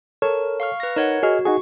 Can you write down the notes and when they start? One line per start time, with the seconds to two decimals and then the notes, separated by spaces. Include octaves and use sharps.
0.22 A4 A#4 C#5
0.60 F5 C#6 F6
0.80 B4 A#6
0.96 D#4 A#4 C#5 F#5
1.23 F#4 G#4 D#5 F6
1.45 D#4 F#4 G#4 C#6